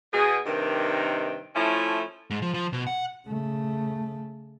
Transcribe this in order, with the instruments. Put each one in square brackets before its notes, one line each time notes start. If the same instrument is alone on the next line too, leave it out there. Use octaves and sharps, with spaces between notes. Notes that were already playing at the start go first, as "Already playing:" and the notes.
[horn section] B2 G#4
G2 C3 D#3
F3 A3 C#4 E4
[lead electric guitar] G#2
F3
F3
B2
F#5
[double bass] C#3 A3